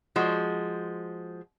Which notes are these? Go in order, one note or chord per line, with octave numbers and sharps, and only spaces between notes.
F3 G#3 F#4